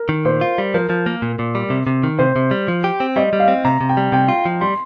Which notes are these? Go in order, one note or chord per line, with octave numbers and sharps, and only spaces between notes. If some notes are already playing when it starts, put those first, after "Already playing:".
Already playing: A#4
D#3
A#2 C5
F4
G3
F3 A#4
F3
A#3
A#2
A#2
G3
C3
C3
D#3
C3 C5
C3
G3
F3
G4
C4
G3 D#5
G3
F5
C4
C3 A#5
C3
G5
G3
C3 G5
F4
F3
G3 C6